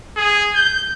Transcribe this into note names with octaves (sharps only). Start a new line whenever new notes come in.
G#4
G6